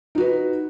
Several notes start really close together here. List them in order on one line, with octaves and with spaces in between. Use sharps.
D#4 F#4 B4